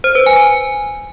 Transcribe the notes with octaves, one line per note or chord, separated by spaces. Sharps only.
C5
B4
G#5